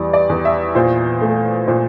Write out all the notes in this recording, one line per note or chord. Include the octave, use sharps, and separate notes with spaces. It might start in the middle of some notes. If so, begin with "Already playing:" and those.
Already playing: E2 E3 G3 D5
D5
E2
E5
A#2 C5
A3
A#2 C5